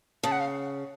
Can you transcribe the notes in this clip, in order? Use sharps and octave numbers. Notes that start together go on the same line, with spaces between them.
C#3 A5
F#5
F5